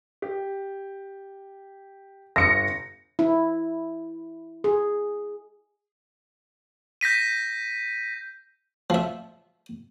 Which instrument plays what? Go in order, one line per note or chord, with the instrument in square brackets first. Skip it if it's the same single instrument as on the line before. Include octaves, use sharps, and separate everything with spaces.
[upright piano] G4
[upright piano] G1 [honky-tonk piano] A#6 C#7
[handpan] E4
G#4
[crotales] G6 A#6 B6 D#7
[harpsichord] F3 E5